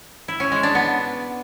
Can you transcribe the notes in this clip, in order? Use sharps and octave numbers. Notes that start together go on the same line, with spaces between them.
E4
C#4
G#3
D4
B3